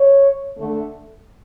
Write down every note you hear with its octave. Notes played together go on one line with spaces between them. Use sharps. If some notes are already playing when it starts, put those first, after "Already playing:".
Already playing: C#5
D3 A3